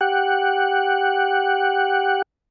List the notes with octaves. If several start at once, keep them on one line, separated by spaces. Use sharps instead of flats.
G4 F#5